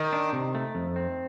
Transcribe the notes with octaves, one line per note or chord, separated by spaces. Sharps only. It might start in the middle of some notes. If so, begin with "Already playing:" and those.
Already playing: D#3
D4
C3
A3
F2
C4